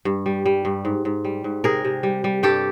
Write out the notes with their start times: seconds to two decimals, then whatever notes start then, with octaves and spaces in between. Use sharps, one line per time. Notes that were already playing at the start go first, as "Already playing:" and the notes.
0.05 G2
0.26 G3
0.46 G3
0.65 G2
0.85 G#2
1.05 G#2
1.25 G3
1.44 G#2
1.64 C3 G#4 A#4
1.85 C3
2.03 G3
2.24 G3
2.43 G2 G4 A4